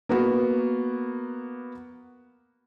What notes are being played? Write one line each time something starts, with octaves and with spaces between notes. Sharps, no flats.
A#3 B3 F#4